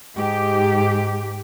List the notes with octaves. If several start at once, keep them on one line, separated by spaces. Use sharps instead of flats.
G#2 G4